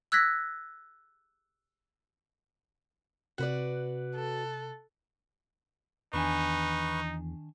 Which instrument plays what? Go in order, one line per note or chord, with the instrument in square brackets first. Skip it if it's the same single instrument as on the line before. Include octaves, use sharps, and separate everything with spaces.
[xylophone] E6 F#6 G#6 A#6 B6
[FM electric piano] C3 F#6 [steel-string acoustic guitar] F#4 B4 D5
[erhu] A4
[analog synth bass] E2 [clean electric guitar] D#3 D4 G#5 [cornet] D#4 [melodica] B4 C#6